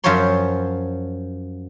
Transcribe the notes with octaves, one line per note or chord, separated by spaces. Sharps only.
F#2 F3 F#3 C5 C#5 C6